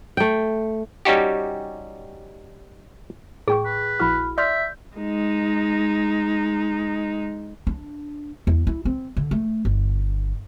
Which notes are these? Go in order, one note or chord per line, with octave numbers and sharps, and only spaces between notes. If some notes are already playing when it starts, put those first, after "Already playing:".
A3 G5
G3 C#4 D#4 F#4 G4
A2 G#4 G5 C#6
B4
A#1 E4 F#4 B5 F6
D5 E5 C6 F6 G6
G#3 D#4
D4
E2
E4
C4
D3
A3
G1